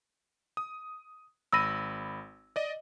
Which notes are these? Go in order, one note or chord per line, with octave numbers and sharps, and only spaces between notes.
D#6
G#1 B5 E6 A#6 D#7
D5 D#5